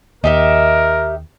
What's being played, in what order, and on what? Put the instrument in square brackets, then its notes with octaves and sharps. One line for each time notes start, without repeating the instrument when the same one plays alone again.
[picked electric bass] D#2 [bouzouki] D#4 G4 E5 [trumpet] A#4